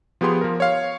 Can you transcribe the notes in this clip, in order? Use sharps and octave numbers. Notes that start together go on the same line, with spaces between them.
F3 B3 G4 G#4 C6
F3 A#4
C#5 F5